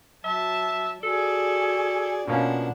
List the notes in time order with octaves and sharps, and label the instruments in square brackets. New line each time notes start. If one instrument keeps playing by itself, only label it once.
[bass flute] F#3 [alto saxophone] E5 [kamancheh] A5
[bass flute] F#4 [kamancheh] G#4 D5 [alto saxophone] A4
[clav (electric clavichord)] B2 A#3 C#4 [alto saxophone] F3 [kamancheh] D4 F#5 [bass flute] D#5